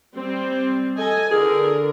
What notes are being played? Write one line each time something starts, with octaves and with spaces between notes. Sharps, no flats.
G3 C4
A4 D#5 G#5
D3 G#4 A#4